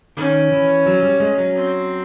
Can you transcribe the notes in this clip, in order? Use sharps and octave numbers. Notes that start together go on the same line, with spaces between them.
D#3 C#4
E3
F#3
G3
G#3
F#3
C4